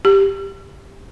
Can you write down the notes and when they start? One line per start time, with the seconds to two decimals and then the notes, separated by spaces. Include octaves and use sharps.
0.05 G4